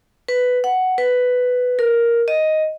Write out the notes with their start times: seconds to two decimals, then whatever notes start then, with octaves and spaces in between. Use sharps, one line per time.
0.28 B4
0.64 F#5
0.98 B4
1.79 A#4
2.28 D#5